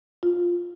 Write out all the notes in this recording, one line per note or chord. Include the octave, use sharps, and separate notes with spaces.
F4